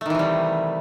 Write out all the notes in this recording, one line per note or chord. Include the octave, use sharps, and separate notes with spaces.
C3 D#3 E3 G3 A3